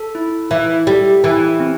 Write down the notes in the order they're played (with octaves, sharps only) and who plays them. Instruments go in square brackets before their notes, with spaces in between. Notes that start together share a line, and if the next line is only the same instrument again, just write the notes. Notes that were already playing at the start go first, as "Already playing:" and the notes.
Already playing: [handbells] A4
E4
[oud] E3 [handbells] E5
[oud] G3 [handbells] A4
[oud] E3 [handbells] E4
[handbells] C4